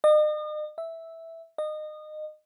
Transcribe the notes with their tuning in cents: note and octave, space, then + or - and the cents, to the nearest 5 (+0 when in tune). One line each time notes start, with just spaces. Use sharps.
D#5 -40
E5 -5
D#5 -25